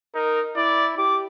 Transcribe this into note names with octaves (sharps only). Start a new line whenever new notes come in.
D#4 A#4
E4 D5
G4 D6